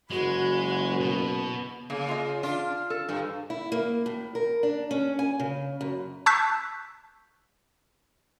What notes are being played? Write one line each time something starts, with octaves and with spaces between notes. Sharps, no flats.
F#1 G#3 F#4 B5
B2
C#3 A#3
F4 D#5
D4 F4
A4
G2
E4
A#3
A2
A#4
D4
C#4
G#5
C#3
F#2
A5 C#6 E6 F#6 G6 B6